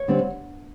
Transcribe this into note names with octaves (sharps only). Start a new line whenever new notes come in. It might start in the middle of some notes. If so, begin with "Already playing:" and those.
Already playing: C#5
D3 G3 C4